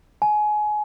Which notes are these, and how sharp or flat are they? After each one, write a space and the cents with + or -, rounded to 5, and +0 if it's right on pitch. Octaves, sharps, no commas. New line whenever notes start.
G#5 +25